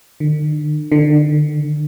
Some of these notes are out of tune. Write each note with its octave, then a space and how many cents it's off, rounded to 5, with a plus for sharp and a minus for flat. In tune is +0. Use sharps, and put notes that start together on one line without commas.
D3 +45
D3 +30